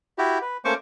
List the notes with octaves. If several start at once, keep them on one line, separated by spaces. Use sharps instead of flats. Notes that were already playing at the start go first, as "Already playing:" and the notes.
E4 F#4 G4
B4
A3 A#3 C#4 C5 C#6 D6